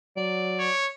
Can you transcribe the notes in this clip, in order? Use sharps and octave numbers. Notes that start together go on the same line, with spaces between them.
F#3 D5
C#5